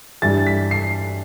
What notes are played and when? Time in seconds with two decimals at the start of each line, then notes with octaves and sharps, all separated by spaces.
0.22 G2 E3 G3 A6
0.47 B6
0.71 C7